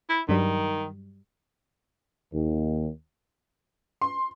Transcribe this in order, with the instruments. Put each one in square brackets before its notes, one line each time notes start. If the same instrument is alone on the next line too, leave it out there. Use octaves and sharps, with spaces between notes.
[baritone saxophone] E4
[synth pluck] G2 F#3 G3 [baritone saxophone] D#3
[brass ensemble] D#2
[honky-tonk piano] C6